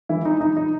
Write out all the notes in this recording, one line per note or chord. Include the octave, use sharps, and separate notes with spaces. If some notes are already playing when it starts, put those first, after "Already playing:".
E3 E4
D#4
D#4
D#4